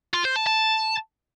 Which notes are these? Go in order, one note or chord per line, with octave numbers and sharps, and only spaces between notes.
F4
C5
A5
A5